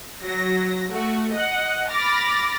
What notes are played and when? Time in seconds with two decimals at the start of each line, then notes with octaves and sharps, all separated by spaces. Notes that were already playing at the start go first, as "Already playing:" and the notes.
0.21 F#3 A#6
0.90 A3 F#4
1.33 D#5 F#5
1.89 B5 D6 F6 A6 A#6